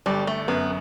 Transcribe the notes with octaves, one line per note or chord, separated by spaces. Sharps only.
G1 G3
A3
F#2 B3